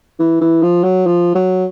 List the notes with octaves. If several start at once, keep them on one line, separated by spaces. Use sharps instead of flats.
E3
E3
F3
F#3
F3
F#3